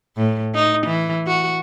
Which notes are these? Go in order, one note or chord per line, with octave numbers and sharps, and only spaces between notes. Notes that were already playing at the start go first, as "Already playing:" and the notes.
A2
D#4
E3
F#4